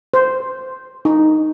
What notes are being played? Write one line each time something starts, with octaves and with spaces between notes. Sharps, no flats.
C5
D#4